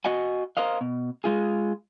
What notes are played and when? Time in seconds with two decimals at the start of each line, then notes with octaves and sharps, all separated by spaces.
0.05 F#4 D#5 F#5 G#5
0.57 A#4 C5 D#5 F5
0.81 B2
1.24 G#3 F4 G#4